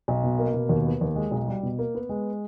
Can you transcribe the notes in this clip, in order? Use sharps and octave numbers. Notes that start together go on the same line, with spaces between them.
B1
B2
A#3
B2
D#2
B3
D#2
G#3
B1
G3
B2
A#3
B3
G#3